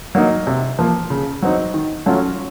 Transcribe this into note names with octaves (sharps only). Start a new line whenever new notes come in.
F#3 A#3 D#4
C3
F3 A#3
C#3
F#3 C4 D#4
D#3
F#3 A3 C#4 F4